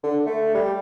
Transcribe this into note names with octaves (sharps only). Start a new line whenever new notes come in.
D3
A3
G3